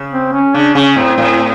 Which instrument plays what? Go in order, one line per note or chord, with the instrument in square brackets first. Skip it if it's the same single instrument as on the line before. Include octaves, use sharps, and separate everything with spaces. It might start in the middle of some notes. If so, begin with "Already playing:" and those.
Already playing: [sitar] C#3
[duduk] C4
C#4
[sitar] C#3 [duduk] D4
[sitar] C#3 [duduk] C#4
[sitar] A2 [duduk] C4
[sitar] A2